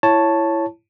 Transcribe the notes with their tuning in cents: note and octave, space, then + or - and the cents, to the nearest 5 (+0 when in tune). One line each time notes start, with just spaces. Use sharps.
E4 +20 C#5 +0 A5 +0